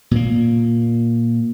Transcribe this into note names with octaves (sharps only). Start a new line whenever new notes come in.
A#2 A#3